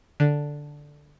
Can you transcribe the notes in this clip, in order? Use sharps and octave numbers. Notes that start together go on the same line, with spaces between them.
D3